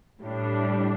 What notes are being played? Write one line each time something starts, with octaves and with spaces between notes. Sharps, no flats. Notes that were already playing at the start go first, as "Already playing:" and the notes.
A2 G3 D4